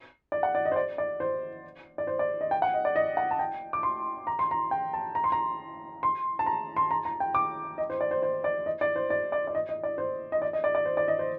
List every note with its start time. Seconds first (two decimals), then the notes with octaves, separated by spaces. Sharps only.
0.32 D5
0.43 F#5
0.55 D5
0.65 D#5
0.72 C5
0.76 D5
0.98 D5
1.20 C5
1.98 D5
2.07 C5
2.19 D5
2.41 D#5
2.51 G5
2.62 F#5
2.74 D#5
2.85 D5
2.96 D#5
3.17 F#5
3.31 A5
3.39 G5
3.73 D6
3.83 C6
4.27 A#5
4.39 C6
4.51 A#5
4.71 G5
4.93 A5
5.15 A#5
5.24 C6
5.32 A#5
6.03 C6
6.39 A5
6.46 A#5
6.76 C6
6.91 A#5
7.05 A#5
7.20 G5
7.35 D6
7.78 D#5
7.90 C5
8.01 D5
8.11 C5
8.23 C5
8.44 D5
8.66 D#5
8.81 D5
8.96 C5
9.10 D5
9.32 D5
9.47 D5
9.55 D#5
9.69 D#5
9.83 D5
9.98 C5
10.32 D#5
10.42 D5
10.53 D#5
10.64 D5
10.75 D5
10.86 C5
10.97 D5
11.08 D#5
11.19 C5